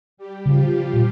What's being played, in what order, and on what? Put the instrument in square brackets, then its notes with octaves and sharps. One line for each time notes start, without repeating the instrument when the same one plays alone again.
[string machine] G3 G4
[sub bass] C#3 [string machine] F3 F4
[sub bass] A#2